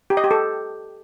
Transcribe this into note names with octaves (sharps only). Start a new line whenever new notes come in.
G4
D#5
G4
A4